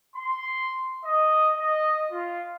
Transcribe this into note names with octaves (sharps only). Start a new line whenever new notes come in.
C6
D#5
D#5
F4